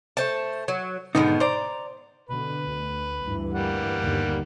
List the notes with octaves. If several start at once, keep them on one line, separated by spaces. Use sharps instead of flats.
A3 C5 A5
F#3
G#2 B2 D3 D#3 B3 D#4
C5 D5 A#5
B2 D3 B4
D2
D2 G2 E3
G3 A#3 F#5
G1 D#2 D3